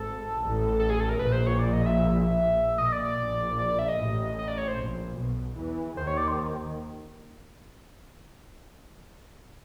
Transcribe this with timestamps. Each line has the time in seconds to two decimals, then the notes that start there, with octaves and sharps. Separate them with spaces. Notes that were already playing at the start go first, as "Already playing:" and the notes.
Already playing: G#1 G#2 A4
0.40 A1 A2
0.79 A4
0.90 G#4
1.00 A4
1.09 A#4
1.19 A#1 A#2 B4
1.32 C5
1.47 C#5
1.59 D5
1.73 D#5
1.86 E5
2.78 A#1 A#2 D#5
2.92 D5
3.05 D5
3.19 A#1 A#2
3.58 D5
3.69 D5
3.79 E5
3.89 D#5
3.98 A1 A2
4.39 D#5
4.48 D5
4.58 C#5
4.68 C5
4.78 A#1 A#2
5.18 B1 B2
5.57 E2 E3
5.97 D#2 D#3 C5
6.07 C#5
6.17 D5
6.28 C5